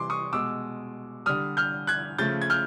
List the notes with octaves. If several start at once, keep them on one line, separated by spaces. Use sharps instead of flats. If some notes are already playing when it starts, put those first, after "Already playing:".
Already playing: C3 E3 G3 C6 D6
C#6 D#6
B2 G#3 D6 E6
D3 G3 D#6 F6
F6 G6
F#6 G#6
C#3 F3 A3 G6 A6
G#6
F6 G6